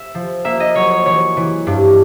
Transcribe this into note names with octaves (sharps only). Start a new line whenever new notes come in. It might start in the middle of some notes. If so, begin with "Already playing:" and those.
Already playing: E5
F3
A#3 E5
D#5
F#3 C#5
C#5
E3 C#5
E3
G2